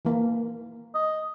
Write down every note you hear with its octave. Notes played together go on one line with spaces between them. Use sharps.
E3 A#3
D#5